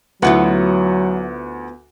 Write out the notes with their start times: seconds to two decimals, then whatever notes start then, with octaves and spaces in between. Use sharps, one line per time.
0.22 D2 F#3 B3 E4 F4 F#5